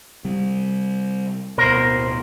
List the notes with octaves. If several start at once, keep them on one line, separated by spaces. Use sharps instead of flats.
C3 G3
D1 B2 A#4 C5